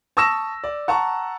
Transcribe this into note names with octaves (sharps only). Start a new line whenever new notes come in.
A5 C#6 D#6 E6 A#6 E7
D5
F#5 A5 A#5 C#6